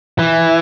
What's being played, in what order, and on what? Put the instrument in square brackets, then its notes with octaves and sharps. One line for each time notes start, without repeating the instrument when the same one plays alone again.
[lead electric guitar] E3